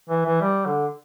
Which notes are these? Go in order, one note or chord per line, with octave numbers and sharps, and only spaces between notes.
E3
E3
G3
D3